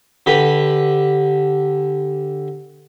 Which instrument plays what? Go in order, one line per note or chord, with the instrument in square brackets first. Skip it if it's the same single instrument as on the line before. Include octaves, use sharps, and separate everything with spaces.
[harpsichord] D3 G4 B4 B5